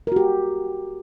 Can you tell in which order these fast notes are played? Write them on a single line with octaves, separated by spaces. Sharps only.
A#4 F#4 G4